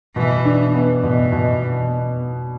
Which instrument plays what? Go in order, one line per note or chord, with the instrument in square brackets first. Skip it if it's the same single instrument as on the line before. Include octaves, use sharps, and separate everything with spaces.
[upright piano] B2 [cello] E3
[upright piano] D4
B3
[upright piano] B2 [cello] E3
[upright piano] B2